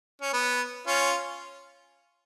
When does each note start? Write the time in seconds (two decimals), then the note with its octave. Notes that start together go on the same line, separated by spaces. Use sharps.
0.22 C#4
0.33 B3
0.87 C#4 F4